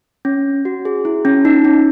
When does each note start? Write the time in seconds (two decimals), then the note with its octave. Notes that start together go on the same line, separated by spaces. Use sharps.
0.25 C#4
0.65 F#4
0.85 G#4
1.05 E4
1.25 C#4
1.45 D#4
1.65 C#4